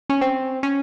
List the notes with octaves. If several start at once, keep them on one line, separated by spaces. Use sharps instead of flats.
C#4
C4
C#4